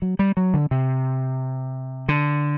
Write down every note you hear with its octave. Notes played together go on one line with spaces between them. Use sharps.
F#3
G3
F#3
D3
C3
D3